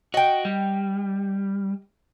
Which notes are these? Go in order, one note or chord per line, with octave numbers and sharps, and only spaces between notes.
F#4 D#5 G5
G3